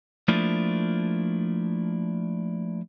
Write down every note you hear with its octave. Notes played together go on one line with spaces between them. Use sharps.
F3 A3 A#3 D4 E4 F4